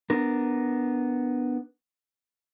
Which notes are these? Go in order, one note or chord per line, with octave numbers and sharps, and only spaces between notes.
B3 D4 A#4